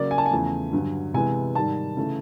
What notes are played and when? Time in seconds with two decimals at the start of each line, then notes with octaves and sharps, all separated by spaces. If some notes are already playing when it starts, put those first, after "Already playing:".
Already playing: C#3 F#3 A#3 D5
0.11 G#5
0.18 A5
0.26 G#5
0.31 E2 C#3 F3 A3
0.73 G2 D3 F#3
1.14 C3 E3 G#3 B3 G#5
1.55 G#2 D#3 G3 A5
1.97 C#3 E3 A3